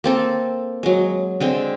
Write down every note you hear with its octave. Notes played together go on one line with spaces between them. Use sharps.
A#3 C4 A4
F#3 G#3
D3 G#3 C4